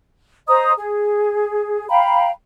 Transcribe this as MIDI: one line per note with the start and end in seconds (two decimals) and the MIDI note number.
0.48 0.72 72
0.48 0.72 75
0.48 0.72 82
0.48 0.72 87
0.78 1.88 68
1.89 2.30 77
1.89 2.30 79
1.89 2.30 82
1.89 2.30 83